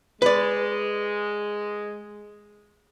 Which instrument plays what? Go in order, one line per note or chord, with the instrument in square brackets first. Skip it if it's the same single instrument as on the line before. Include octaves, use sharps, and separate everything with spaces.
[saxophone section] G#3 [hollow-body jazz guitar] B4 D5